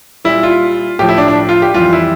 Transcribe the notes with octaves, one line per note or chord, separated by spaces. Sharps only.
A#2 G3 E4
F4
A2 F3 G4
E4
D4
D4
F4
G4
F2 E3 G3 F4
E4